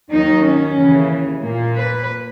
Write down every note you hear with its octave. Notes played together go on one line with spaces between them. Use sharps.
D#2 D#3 F#3 D#4
C#4
D#2 C#3 E3
A#2 A#3
B4